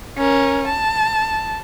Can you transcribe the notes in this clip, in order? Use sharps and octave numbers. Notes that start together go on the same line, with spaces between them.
C#4 A#4
A5